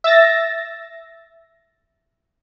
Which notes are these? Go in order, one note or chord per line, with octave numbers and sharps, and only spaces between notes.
E5 E6 A6 A#6